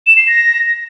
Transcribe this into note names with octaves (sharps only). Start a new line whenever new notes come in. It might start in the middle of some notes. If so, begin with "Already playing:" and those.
E7
C7
A#6